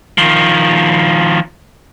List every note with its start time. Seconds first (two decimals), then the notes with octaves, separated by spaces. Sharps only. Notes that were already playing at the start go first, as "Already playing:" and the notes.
0.18 D#3 F3